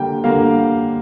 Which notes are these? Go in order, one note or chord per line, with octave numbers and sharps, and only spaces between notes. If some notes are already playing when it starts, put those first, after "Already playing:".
Already playing: D3 G3 A#3 G5
D3 G3 A#3 F5